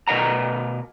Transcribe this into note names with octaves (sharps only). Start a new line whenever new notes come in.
B2 A#4 D#5 F#5 A#5